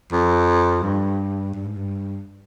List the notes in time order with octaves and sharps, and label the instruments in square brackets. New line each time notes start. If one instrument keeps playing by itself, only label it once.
[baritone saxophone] F2
G2
G2
G#2
G2